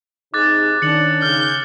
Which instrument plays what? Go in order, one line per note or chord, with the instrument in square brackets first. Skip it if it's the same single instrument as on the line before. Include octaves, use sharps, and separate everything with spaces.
[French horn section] C3 D#4 G#4 [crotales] D6 F#6 A6
[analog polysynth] D#3 [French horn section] C#4 D4 [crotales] C#7 F#7
[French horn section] C#3 [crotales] F6 [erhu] G6